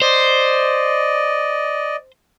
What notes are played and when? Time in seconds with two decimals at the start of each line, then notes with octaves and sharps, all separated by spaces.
0.02 C5 D5 D#5